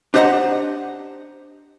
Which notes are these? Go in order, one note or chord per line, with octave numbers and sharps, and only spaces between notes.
D4 G4 C5 D#5 F#5 A#5